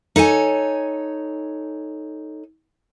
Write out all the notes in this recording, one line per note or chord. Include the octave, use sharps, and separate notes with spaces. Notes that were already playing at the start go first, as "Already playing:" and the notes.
D#4 A4 C#5 G#5